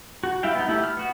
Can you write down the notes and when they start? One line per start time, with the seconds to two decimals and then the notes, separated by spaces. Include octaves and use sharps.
0.24 F#4
0.43 G3 E4 E5 F5 G5
0.55 B3 D#4
0.68 A3 E4 G4
0.84 F6
0.97 B3 F#4